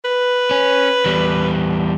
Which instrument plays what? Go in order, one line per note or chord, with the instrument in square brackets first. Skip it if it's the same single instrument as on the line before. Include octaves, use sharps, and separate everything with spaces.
[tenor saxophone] B4
[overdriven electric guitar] C#4
E2 G3